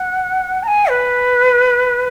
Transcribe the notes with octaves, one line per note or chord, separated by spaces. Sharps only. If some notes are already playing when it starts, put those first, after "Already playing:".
Already playing: F#5
A#5
G#5
B4